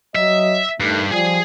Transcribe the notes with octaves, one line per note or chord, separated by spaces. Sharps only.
F#3 D#5 E5
G2 D#3 A3
F3 G3 G#4 G#5